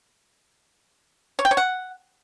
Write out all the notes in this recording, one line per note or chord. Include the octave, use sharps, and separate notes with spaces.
C#5
G5
C#5
F#5